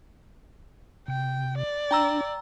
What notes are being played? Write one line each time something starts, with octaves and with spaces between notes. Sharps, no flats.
C3 G5
D5
D4 G5 A#5 E6